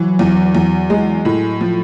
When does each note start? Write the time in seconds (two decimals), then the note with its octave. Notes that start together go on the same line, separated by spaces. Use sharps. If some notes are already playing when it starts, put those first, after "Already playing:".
Already playing: E3 F#3
0.19 E2
0.55 E2
0.90 G#3
1.25 A2
1.61 F3